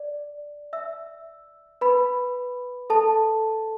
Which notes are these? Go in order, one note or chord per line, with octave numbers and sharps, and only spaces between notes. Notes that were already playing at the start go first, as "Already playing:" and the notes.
Already playing: D5
E5 E6
B4 B5
A4 A5